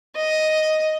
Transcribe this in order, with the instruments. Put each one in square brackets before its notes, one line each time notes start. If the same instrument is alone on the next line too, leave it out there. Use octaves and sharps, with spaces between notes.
[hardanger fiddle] D#5